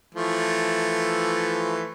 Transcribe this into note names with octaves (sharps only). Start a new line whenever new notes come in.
E3 F3 A3